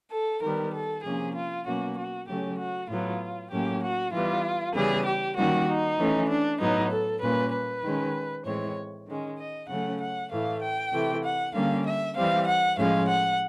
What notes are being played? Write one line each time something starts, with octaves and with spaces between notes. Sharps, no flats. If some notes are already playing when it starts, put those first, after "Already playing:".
A4
D#3 G3 B3 A#4
A4
C3 F3 A#3 C#4 G#4
F4
B2 F#3 A#3 C#4 F#4
F#4
C#3 F#3 A3 C#4 G4
F#4
A2 F#3 B3 F4
A2 F#3 A#3 C#4 G4
F#4
E3 G3 B3 F4
C#3 E3 G3 B3 G#4
G4
D#3 G3 A#3 C#4 F#4
D#4
E3 A3 C#4
D4
A2 F#3 B3 D#4
A4
A#2 G3 A#3 C#4 B4
B4
D#3 G#3 C#4
A2 E3 G#3 C4 C#5
D#3 G#3 C#4
D#5
C#3 F#3 A3 C#4 F#5
F#5
A2 E3 A3 F5
G5
C3 E3 A3
F#5
D3 G3 A#3 C#4 F5
E5
E3 G3 C4 F5
F#5
A2 F3 G#3 C#4 F5
F#5